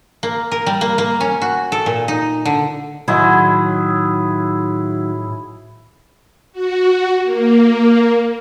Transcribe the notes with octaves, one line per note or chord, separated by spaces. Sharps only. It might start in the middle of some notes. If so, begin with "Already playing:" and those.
A#3
A#4
G3
A#3
A#3
C#4
F#4
A4
A#2
D#4
D3
A2 D#3 F#3 E4 G#4 C6
F#4
A#3